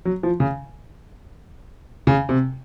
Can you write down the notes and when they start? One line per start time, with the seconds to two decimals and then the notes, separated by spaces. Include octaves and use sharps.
0.05 F#3
0.23 F3
0.40 C#3
2.07 C#3
2.29 C3